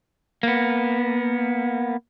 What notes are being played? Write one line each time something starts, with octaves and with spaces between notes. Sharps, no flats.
A#3 B3